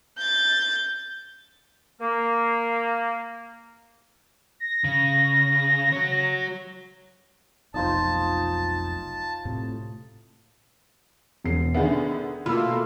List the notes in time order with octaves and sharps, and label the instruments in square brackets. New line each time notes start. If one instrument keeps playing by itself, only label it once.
[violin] G6 A6
[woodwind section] A#3
[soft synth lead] A#6
[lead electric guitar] C#3
F#4 C#5
[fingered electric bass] F1 B1 [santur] D#4 F4 C5 [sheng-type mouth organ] A5
[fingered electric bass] A2 C3 A3
[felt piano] E1 C7
[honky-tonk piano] D3 D#3 B3 [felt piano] G#4 E5
[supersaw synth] B2 A3 A#3 [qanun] F4 [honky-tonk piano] B5 E6